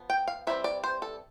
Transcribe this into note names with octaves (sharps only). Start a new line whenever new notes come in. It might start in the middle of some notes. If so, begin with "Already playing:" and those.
Already playing: F3 B3
G5
F5
E3 G3 C4 E5
D5
C5
A4